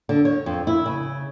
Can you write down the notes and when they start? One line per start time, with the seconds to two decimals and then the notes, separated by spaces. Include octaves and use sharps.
0.09 D3
0.25 C#5
0.46 F2
0.67 E4
0.86 C#3